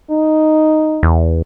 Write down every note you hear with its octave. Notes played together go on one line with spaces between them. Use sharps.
D#4
E2